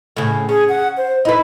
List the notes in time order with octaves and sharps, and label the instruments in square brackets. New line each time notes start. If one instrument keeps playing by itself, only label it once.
[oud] A2 C#3
[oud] C#4 [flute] G#4
[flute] F#5
C5
[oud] D#4 B4 [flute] E4